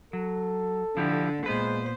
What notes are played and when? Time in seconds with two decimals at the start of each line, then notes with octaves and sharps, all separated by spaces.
0.13 F#3 A4
0.97 D3 F3 E4 G4
1.46 A#2 G#3 B3 B4 C5